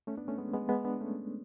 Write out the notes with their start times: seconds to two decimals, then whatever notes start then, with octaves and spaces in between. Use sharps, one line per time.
0.07 A3 C#4
0.17 B3 D4
0.28 A3 C#4
0.38 G#3 B3
0.54 G#3 B3
0.69 G#3 B3
0.84 B3 D4
1.00 A3 C#4